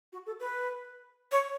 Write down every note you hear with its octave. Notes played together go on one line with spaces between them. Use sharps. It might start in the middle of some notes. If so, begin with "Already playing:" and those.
F#4
A4
B4
C#5